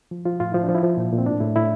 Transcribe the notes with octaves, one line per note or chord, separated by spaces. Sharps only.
F3
F3 F4
A2 F4
F3 E4
D4
F3
E4
F3
A#2
A#2
C4
A2 D4
A2 E4
A2 E4